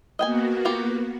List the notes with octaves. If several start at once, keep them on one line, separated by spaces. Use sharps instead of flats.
A#3 B3 F#4 D#5 G5 G#5
F4 G4